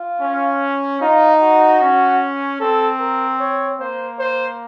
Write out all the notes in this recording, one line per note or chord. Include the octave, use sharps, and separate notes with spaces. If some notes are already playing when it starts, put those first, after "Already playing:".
Already playing: F4
C#4
D#4 F4
F#4
C#4
C4 A4
A#4
C#5
A#3 C5
C5